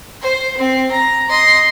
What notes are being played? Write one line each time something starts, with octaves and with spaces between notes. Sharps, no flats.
C5
C4
A#5
D#5 C6